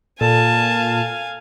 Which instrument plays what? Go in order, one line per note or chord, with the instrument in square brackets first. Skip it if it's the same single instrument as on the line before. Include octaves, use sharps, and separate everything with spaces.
[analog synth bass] A#2 [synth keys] A4 [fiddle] F5 G#5 [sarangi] A5